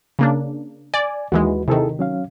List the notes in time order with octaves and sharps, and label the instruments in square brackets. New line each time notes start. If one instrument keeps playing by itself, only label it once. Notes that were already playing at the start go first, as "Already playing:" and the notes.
[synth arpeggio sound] C#3 A#3 D4
[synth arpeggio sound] D5 [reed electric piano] G#5
[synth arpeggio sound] D#2 E3 G#3 [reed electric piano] F#4 B4
[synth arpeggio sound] C3 D#3 [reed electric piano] E4 G#4 A4
[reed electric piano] F#3 C#4 F5